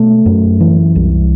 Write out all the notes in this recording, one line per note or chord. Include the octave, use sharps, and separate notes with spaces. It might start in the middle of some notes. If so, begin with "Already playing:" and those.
Already playing: B2 A3
F#2
E3
C2